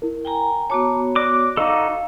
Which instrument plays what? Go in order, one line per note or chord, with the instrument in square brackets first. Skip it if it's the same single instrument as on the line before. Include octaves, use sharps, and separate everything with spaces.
[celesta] E4 A#4
[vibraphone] G5 G#5 A#5
[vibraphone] B3 F#4 C#5 [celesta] A5 A#5 D6
[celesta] D5 F#6 A#6 [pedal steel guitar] D6
[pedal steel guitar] D#4 F#4 A4 [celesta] D#5 D6 [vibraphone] F5